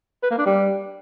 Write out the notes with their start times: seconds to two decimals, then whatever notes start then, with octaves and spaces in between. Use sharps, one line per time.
0.23 B4
0.31 A#3
0.38 D4
0.46 G3